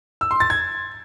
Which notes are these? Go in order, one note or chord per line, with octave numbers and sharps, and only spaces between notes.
E6
C6
A6
G#6